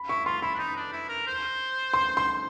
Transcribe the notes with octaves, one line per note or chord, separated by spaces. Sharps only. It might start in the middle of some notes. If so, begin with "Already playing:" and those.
Already playing: B5
E4 C#6
F4 C6
E4 B5
D4
D#4
D4
E4
A#4
C5
C6
C6